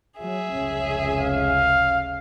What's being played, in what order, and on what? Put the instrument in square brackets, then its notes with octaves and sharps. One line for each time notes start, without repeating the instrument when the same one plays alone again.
[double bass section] F#3 [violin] G#4 E5
[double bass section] F1 C#2 C#4
[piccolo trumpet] F5